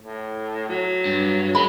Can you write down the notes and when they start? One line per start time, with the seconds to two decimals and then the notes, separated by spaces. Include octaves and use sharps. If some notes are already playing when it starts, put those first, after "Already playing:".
0.03 A2
0.68 F#3
1.06 G2
1.55 F#2 G#3 B5